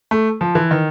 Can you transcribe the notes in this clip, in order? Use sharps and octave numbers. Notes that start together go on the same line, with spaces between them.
A3
F3
E3
D#3